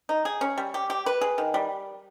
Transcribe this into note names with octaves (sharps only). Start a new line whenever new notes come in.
D#4
G#4
C#4
G3
G4
G4
B4
G#4
D#3
G3